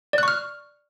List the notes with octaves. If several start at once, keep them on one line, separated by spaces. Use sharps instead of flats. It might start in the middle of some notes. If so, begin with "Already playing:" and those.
D5 C#6 F6 F#6